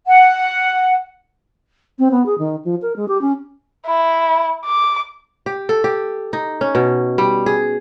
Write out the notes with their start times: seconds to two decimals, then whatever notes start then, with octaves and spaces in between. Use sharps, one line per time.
0.06 F#5
1.99 C4
2.11 B3
2.26 G#4
2.38 D#3
2.64 F3
2.82 A#4
2.96 G#3
3.08 G4
3.21 C#4
3.86 E4
4.65 D6
5.46 G4
5.69 A4
5.84 G4
6.33 D#4
6.61 C#4
6.75 B2
7.18 G3
7.46 G#4